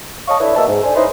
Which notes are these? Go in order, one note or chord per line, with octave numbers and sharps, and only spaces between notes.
C#5 D#5 F5 A5 C#6
D4 E4 A4 B4 C#5
B2 A#3 D#5 E5 A5
G#2
D4 A4 C5 G#5
C#4 D#4 E4 B4 C5